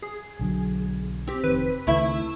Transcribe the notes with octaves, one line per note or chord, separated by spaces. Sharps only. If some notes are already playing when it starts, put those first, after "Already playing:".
G#4
B1 D3 F#3
C4 G4
F1 D#3 B4
C#2 D#3 A3 E4 E5